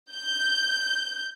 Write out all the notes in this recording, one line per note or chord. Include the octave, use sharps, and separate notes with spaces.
G6